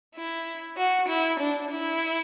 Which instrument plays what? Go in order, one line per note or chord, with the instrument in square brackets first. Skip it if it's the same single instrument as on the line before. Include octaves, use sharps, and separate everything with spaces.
[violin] E4
F#4
E4
D4
E4